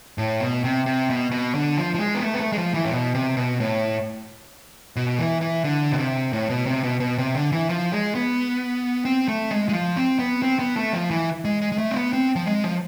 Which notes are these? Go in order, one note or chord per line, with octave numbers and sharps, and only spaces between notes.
A2
B2
C3
C3
B2
B2
D3
F3
F3
G#3
B3
A3
B3
A3
G#3
F3
E3
A2
B2
C3
B2
A2
B2
E3
E3
D3
B2
C3
A2
B2
C3
B2
B2
C3
D3
E3
F3
G#3
B3
C4
A3
G#3
G#3
F3
C4
B3
C4
B3
A3
F3
E3
G#3
G#3
G#3
A3
C4
B3
C4
F3
G#3
F3